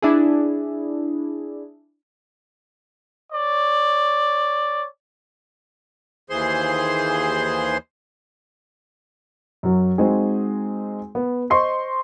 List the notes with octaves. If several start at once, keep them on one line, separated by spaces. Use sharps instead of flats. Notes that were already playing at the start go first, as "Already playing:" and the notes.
D4 E4 G#4
C#5 D5
D#2 E3 G#4 C5 C6
F#2 F#3
G#3 C4 D#4 F#4 G#4
B3
C5 D#5 C6 C#6 C7